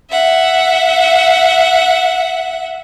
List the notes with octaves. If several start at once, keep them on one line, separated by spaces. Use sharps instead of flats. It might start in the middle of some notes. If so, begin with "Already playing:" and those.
E5 F#5